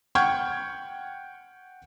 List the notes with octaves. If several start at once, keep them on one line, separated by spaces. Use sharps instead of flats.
F#5 G5 C#6 F6 G6 G#6